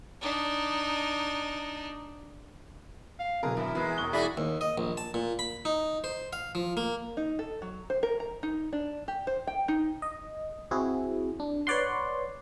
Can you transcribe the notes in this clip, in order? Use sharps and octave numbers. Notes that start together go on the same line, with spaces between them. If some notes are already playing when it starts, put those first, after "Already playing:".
D4 D#4
F5
B2 D3 F#3 G#4 A#4
E3 E4
E2 E3 G#3 B3 B5
E1 C#6 G7
G2 E4 F#4 G#4 D5 B5
D#2
D#5
A#1
A5
A#2
B5
D#4
C5
F5
F3
A#3
D#4
A4
F#3
C5
A#4
A#5
D#4
D4
G4
C5
G5
D#4
D#5
C4 E4 F#4 G#4
D4
B4 C#5 D5 F#5 C6